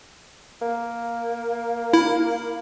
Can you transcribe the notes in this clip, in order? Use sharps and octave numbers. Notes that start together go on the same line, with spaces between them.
A#3
E4